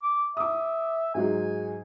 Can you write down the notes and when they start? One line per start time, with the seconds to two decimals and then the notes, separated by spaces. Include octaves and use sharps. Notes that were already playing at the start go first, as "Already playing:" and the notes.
0.03 D6
0.37 E5 D6 D#6
1.15 G#2 F#3 G#3 G#5